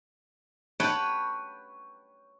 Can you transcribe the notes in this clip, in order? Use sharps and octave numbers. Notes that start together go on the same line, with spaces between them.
B4 C#5 F#5 G5 A5 B5